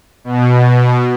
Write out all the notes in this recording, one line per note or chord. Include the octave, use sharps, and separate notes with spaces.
B2